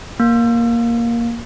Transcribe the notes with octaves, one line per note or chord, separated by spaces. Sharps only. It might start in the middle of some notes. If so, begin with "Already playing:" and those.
A#3